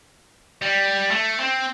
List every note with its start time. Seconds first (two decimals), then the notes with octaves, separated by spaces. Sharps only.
0.62 G3
1.11 A3
1.40 C4